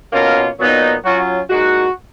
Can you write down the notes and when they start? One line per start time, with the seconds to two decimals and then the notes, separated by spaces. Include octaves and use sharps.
0.12 B2 A#3 C#4 F4 A#4
0.59 A#2 F#3 B3 D#4
1.04 F#3 C#4 F4 F#4
1.50 A#2 G#3 D#4 F#4